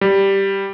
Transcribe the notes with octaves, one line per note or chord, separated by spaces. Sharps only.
G3